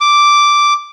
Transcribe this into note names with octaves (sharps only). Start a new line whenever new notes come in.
D6